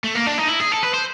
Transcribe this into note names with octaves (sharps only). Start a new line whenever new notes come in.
A3
A#3
D4
D#4
E4
G#4
A4
B4
C5